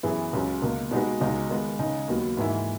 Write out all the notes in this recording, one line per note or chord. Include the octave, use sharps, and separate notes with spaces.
F#2 E3 B3 E4 G#4
C#2 C#3 F#3 C#4
C#2 B2 A#3
B2 G#3 D#4 F#4 B4
C#2 B2 G#3 D#4
D#3 G#3 B3
C#3 G#3 D#4
D#2 D#3 F#3 B3 F#4
G#2 E3 A#3 E4